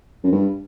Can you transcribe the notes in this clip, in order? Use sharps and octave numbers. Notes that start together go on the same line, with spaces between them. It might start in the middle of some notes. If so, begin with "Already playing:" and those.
F#2
G2